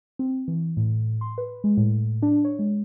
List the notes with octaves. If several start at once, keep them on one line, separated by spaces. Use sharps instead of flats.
C4
E3
A2
C6
B4
G#3
A2
D4
C#5
G#3